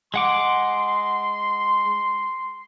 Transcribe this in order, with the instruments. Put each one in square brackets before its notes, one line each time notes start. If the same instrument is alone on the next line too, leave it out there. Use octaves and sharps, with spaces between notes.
[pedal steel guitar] G#3 F#5 D6 [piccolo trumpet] C6